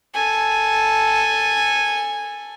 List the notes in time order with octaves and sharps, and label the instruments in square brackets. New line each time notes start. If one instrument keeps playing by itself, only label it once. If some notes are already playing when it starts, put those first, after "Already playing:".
[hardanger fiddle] A4 G#5